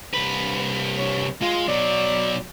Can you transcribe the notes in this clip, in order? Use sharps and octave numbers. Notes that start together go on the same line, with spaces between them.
C2 B4
C#5
G#3 F4
B2 F#3 D5